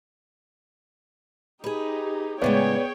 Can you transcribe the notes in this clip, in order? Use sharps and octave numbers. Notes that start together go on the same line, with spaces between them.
D#4 G4 G#4 B4
A2 C#3 G#3 B3 G#4 C#5 D5 G5